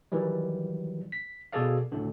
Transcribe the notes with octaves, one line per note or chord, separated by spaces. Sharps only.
D#3 E3 F#3 G3
B6
B2 F#4 G#4 A4 D5 F5
D2 A2 D3